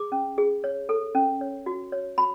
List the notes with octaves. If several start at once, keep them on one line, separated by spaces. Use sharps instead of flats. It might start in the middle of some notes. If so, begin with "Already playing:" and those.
Already playing: G#4 D6
C#4
G#4
C#5
A4
C#4
C#5
F#4
C#5
F#4 B5